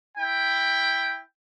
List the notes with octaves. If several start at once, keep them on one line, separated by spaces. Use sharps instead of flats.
E4 G5